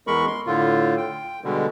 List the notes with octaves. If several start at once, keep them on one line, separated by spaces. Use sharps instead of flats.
E2 G#3 A#4 B5 C#6
C6
A2 D3 F4
G5
B2 D3 G3 G#3